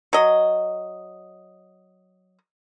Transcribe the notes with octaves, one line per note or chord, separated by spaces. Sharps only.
F#3 D#5